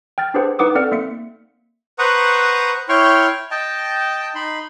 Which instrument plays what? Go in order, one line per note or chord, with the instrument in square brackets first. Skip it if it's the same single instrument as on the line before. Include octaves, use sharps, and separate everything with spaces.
[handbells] G5 F6 A6
D4 G4 G#4 B4 C5 F#5
D#4 B4 F#5 D6 D#6
C4 A4 D5 F#5 F6
A#3 E5 C#7
[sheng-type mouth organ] B4 C5 F#5 A#5 C#6 D#6
E4 C#5 G5 C6 C#6 F6
D#5 G5 A5
D#4 B5 C6